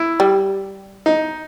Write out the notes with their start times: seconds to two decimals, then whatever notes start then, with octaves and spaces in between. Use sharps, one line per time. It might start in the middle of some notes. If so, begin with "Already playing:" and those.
Already playing: E4
0.20 G3
1.06 D#4